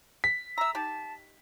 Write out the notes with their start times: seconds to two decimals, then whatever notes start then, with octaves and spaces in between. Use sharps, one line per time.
0.24 B6
0.58 E5 A#5 E6
0.75 D#4 G4 A5